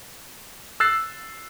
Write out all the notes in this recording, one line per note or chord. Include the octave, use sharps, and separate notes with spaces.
E6 F#6 A6 C7